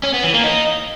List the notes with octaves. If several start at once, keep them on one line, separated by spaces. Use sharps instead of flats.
C#4
B3
E3
A#3
D#4